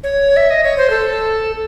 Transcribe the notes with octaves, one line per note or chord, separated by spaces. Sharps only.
C#5
E5
D#5
C#5
C5
A4